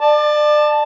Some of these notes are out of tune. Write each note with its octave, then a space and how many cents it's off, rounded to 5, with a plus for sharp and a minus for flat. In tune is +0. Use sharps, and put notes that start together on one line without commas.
D5 +30 A5 +0